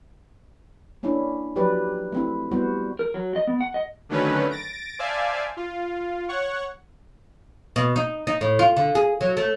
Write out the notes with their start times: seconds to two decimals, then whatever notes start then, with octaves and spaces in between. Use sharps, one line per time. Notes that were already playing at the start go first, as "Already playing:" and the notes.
1.03 A#3 C#4 D4 E4
1.56 F3 F#3 G4 B4 D5
2.12 A3 C4 E4
2.51 G3 B3 E4 F#4 C5
2.99 A#4
3.14 F#3
3.36 D#5
3.47 B3
3.61 F#5
3.74 D#5
4.09 D3 D#3 F#3 A3 C#4 B4
4.50 A6 A#6 D7
4.99 C5 D5 E5 F5 G#5 A5
5.57 F4
6.29 C#5 F#5 C#6
7.76 B2
7.96 D#4
8.27 D#4
8.41 A2
8.59 F4
8.77 D3
8.95 G#4
9.21 F#3
9.37 A3